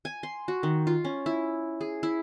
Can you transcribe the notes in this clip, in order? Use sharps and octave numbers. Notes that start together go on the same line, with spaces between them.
G#5
C6
F#4
D#3
F4
C#4
E4
G#4
E4